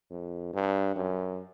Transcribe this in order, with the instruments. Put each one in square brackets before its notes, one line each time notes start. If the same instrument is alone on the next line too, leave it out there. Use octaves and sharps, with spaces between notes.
[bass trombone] F2
G2
F#2